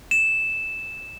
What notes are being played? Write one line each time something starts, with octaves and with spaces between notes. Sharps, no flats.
E7